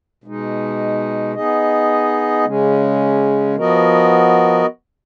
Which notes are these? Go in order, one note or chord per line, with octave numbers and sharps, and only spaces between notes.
B2 G#3 D#4
B3 D#4 G#4 D#5
C#3 G#3 C#4
F3 B3 F#4 A#4 D#5